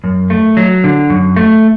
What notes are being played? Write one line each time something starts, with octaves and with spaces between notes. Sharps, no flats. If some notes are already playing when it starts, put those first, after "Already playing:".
F#2
A3
F#3
D3
F#2
A3